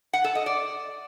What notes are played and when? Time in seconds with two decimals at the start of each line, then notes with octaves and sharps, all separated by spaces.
0.13 F#5
0.24 A4
0.35 D#5
0.46 D5